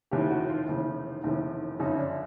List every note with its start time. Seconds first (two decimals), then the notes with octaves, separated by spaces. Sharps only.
0.11 F1 D#2 C#3 E3 G4
0.30 F#4
0.49 F4
0.68 F1 D#2 C#3 E3
1.24 F1 D#2 C#3 E3
1.79 G1 F#2 C#3 F3 D#4
1.93 C#4
1.99 D4